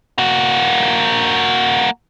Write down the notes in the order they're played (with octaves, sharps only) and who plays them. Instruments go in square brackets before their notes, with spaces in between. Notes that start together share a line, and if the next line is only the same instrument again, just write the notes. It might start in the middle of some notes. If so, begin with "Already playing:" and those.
[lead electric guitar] A#3 F#4